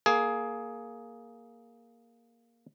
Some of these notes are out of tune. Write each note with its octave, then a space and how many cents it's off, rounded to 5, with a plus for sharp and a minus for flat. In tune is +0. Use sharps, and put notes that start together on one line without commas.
A#3 +0 G#4 +15